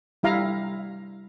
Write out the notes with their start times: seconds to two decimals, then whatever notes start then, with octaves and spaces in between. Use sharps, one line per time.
0.23 G3 E4 F5 A#5